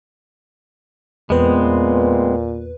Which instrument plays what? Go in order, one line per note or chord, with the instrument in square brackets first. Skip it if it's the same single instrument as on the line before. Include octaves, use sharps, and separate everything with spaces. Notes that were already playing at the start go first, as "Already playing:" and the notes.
[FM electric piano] E2 B4 [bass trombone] A#2 [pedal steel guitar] G#3 B3 C4